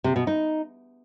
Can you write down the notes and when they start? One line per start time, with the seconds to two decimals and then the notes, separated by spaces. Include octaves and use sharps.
0.04 C3
0.16 B2
0.27 D#4